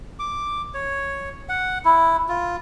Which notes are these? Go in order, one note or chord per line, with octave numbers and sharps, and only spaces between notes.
D6
C#5
F#5
E4
F4